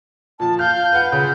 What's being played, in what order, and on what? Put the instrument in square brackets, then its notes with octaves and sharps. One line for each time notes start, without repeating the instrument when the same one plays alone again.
[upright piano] A#2 F3 [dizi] A5
[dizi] F5 [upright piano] F6 [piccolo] G6
[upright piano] B4 F#5
[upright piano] C#3 [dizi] F4